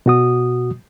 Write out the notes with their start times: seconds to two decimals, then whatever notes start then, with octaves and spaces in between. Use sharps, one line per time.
0.06 B2 F#4 D#6